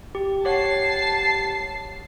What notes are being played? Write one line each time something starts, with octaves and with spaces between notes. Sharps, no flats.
G4
G4 C#5 F#5 A5 C7